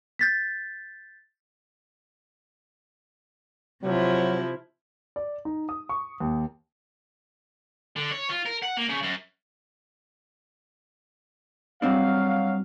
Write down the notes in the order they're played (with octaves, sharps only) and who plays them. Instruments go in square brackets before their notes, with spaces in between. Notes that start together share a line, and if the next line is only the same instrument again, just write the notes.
[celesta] G6 A6 B6
[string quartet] C3 F3 E4 [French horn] F#3
[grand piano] D5
D#4
D#6
C#6
D#2
[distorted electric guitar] D3
C#5
F4
A#4
F#5
A#3
C#3
F#2
[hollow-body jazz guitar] G2 C4 D4 [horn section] F#3 F5